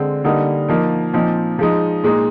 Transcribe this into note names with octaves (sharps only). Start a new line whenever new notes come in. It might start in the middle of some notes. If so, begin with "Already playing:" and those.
Already playing: D3 G#3 C4
D3 G3 A#3 D#4
F3 A#3 D#4
A#2 F3 C4 D#4
F3 G#3 D#4
A#2 G#3 D#4